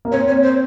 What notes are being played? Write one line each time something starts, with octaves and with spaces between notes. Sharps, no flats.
A#3
C4 C#5
C#5
C5